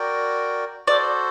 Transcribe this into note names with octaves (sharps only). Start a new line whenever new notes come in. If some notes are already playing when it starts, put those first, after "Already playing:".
Already playing: F#4 A#4 D5 G5
F#4 A4 C5 D5